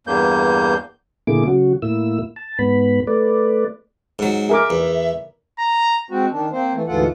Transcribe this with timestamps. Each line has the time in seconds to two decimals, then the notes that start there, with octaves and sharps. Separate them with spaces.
0.07 E2 G2 A#3 G6
1.27 A#2 D3 A#3 E4 G#4 D6
1.47 C#3 F#3 F#4
1.82 A2 A#3 E4 E6
2.36 A5
2.59 G#2 B3 B5
3.07 A3 B4 D5
4.19 G#2 F#3
4.49 G#4 A#4 E5 D6
4.70 E2
5.59 A#5
6.09 G#3 C4 F#4
6.31 D#3 D4
6.52 A#3 C4 C5
6.73 E3 A3
6.88 D2 G#2 E3 F4 A4 F#5